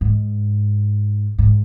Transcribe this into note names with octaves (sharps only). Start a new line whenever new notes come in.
G#2
G#2